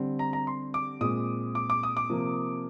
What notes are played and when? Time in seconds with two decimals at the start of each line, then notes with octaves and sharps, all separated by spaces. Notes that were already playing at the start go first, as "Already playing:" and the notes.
Already playing: D3 G3 C4
0.19 A#5
0.33 A#5
0.47 C6
0.74 D6
1.01 A#2 G#3 C4 D#6
1.55 D6
1.70 D6
1.83 D#6
1.97 D6
2.09 C3 F3 A#3